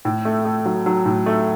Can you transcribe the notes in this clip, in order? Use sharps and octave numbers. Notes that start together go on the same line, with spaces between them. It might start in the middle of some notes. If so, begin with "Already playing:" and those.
A2
A3
A3
F#3
F#3
A2
A3